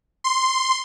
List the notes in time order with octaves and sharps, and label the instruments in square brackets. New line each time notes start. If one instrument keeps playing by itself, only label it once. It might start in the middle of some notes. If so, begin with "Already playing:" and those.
[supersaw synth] C6